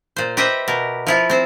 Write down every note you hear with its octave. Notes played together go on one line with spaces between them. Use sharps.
A#2 C5
G4 B4 C5 D#5 E5 G5
B2 A#4
F3 E4 F4
C4 C5